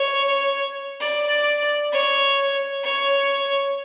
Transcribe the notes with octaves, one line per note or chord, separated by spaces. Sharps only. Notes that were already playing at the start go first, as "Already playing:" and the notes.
Already playing: C#5
D5
C#5
C#5